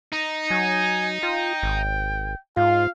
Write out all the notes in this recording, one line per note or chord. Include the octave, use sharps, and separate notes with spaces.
D#4
F#3 G#5
F4 G5
G#1
G#2 F4 F5